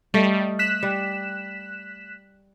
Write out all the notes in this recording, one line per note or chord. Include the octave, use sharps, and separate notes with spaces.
G3 A3 D#5
F#6 B6 E7
G3